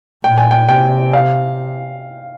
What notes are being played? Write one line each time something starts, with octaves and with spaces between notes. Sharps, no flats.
A#2 G5
G#5
G5
C3 G5
F5